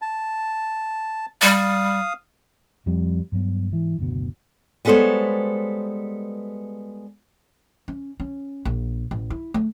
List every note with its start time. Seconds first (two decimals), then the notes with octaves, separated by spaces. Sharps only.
0.02 A5
1.42 G3 F5 D#6
2.86 F2 F3 G3 C4
3.32 G2 F#3 B3
3.71 G#2 E3
3.99 F#1 D2 B2
4.85 G3 G#3 B3 A4 C5 C#5
7.88 C#4
8.20 C#4
8.65 A#1
9.11 A1
9.30 E4
9.54 A3